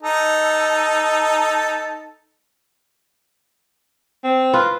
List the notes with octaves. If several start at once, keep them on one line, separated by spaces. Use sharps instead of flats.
D#4 A4
C4
F4 B4